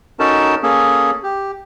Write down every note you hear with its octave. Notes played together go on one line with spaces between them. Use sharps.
C#4 D#4 F#4 A4 A#4 A5
A#3 C#4 G#4 A4
G4